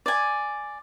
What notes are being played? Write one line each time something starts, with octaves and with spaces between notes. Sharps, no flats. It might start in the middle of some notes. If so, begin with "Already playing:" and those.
D5 G#5